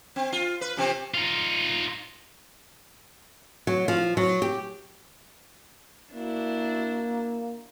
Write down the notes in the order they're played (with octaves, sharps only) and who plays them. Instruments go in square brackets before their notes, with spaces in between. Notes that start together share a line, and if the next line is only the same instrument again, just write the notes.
[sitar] C4
F4
B4
C3 F3 C4
[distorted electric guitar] D#4 F4
[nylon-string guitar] F#3
F3
F#3
G4
[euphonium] A#3 [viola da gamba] D4 E4 F#4